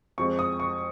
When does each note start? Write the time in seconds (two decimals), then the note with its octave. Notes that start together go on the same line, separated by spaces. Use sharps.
0.18 F2 F3 G#3 C#6
0.39 D#6
0.60 C#6